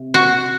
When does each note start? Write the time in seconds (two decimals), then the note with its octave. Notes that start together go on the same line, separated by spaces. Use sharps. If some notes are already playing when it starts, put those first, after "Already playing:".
Already playing: C3
0.14 F#4